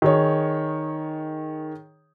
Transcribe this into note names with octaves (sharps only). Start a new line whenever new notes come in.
D#3 G#4 C#5